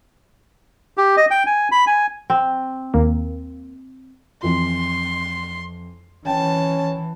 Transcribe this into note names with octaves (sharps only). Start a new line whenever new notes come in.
G4
D#5
G5
G#5
B5
G#5
C4
D#2 A#3
F2 E3 F4 C6
E3 C#4 G5 A5